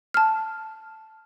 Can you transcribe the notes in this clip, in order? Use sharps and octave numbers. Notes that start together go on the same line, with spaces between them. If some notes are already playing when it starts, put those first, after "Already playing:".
A5 F6